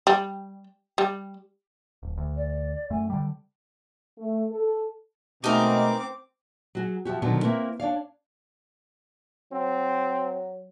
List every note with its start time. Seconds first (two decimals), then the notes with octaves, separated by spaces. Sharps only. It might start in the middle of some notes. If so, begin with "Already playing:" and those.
0.07 G3
0.98 G3
2.03 D1
2.18 D2
2.37 D5
2.90 F#2 A3 G#5
3.10 D3 G3 G5
4.18 A3
4.51 A4
5.44 B2 G#3 A3 C4 D#4 E4 A#4 D6
6.75 F#3 F#4 G#4
7.05 F3 E4 F#4 G4
7.22 B2 D3 D#3 F3 F#3 B3
7.43 A#3 C4 E4 A#4 B4
7.80 D4 C#5 D5 F5
9.52 F#3 C4